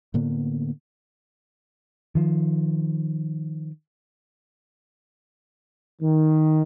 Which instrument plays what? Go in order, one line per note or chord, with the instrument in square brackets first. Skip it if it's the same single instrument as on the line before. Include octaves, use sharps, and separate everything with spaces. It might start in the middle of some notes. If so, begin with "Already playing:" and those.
[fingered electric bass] A2 D3 A#3 B3
[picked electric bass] D#3 F3
[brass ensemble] D#3